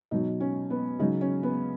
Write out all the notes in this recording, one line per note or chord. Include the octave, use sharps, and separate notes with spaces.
B2 F#3 D#4
C#4
B3
C#3 F#3 D#4
C#4
B3